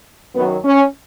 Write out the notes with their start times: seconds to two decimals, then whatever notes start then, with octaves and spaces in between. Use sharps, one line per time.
0.35 F#2 D#3 F#3 B3
0.64 C#4